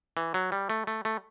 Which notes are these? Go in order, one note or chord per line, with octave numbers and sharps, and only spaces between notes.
E3
F#3
G3
A3
A3
A3